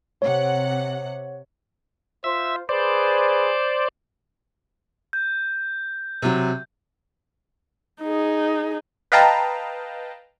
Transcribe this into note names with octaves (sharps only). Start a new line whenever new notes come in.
C3 C#5 F#5
F4 C5 E5
G#4 B4 C5 D5
G6
C3 F#3
D#4 G#4
B4 D#5 F5 G5 A5 A#5